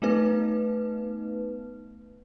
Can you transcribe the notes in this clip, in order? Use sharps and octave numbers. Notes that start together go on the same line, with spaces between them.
A3 B3 D#4 B4